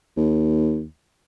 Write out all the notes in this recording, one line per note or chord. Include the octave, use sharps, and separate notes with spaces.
D#2